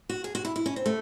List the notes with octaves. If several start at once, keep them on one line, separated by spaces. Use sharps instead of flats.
F#4
G#4
F#4
E4
E4
C#4
C4
A3